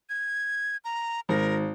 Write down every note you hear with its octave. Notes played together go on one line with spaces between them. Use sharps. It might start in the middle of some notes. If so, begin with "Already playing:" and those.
G#6
A#5
G#1 A#4